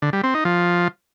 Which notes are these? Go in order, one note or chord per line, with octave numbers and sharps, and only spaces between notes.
D3
G3
C4
D#4
F3